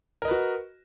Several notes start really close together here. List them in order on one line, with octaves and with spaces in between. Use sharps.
A#4 D#5 B4 F#4